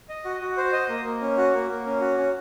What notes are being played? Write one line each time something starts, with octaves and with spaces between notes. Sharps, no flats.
D#5
F#4
F#4
C5
D#5
A#3
A#3
C#4
F#4
A#3
A#3
C#4
F#4
C#4